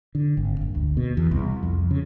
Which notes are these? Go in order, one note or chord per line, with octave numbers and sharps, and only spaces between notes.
D3
G#1
F#1
D2
B2
E2
C2
F2
C#3